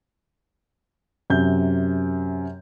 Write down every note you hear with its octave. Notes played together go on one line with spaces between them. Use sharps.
F#2 C3 G6